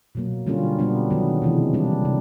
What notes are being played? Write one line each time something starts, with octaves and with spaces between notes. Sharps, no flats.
B2 F#3 A#3
D3 G3 A#3 C#4 F4
B2 G3 B3 D4
D#3 F#3 B3
C3 E3 G#3
G3 A#3 D4
C3